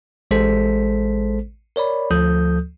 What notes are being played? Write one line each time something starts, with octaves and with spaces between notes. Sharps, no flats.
A1 G#3 A4 C5 B6
A#4 C#5 D5 B5
D2 F3 A4 D#6 G6